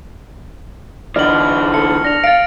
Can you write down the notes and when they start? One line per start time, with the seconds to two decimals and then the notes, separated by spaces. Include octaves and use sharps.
1.16 D3 E3 D5 D#5 F6 F#7
1.74 A4 C#7
2.04 D4 A#6 F7
2.24 F5 A6 C#7 D7